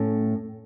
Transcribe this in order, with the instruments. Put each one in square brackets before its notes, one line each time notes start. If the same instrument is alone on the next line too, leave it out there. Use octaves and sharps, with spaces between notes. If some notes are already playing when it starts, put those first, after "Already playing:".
Already playing: [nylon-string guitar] A2 A3 C#4